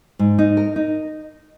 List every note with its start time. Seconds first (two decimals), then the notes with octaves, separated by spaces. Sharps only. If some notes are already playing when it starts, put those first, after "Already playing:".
0.19 G#2
0.39 D#4
0.57 A#4
0.76 D#4